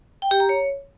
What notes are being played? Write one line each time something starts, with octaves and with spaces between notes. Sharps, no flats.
G5
G4
A#5
C#5